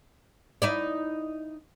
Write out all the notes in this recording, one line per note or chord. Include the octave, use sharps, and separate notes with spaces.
D#4 E4 D5